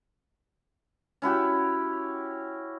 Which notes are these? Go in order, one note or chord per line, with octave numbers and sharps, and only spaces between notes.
C#4 E4 F#4 G4